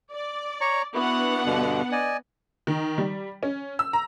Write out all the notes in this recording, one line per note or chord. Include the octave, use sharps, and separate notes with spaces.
D5
C#5 A#5 C#6
B3 D4 E4 F#4 F#5
G2 B2 D3
D5 D#5 G#5
D#3
G3
C#4
E6
A#5